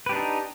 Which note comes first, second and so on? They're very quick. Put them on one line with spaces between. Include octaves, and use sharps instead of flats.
B4 G4 D4 D#4